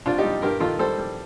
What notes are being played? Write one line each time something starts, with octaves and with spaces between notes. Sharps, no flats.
C2 D4 F4
D#4 G4
G3
G2 G4 A#4
D#3 F4 A4
G3 A4 C5
G3